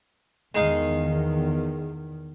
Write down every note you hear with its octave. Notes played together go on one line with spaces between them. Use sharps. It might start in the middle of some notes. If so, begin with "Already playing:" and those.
E2 D#3 G#3 D#4 F5